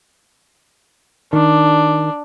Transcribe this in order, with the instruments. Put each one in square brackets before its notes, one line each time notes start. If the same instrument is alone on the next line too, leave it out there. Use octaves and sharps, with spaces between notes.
[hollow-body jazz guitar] D#3 [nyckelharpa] D4